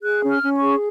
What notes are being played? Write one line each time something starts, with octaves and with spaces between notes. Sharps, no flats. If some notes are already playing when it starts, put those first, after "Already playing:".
G#4 F#6
C#4
F6
C#4
C#6
G#4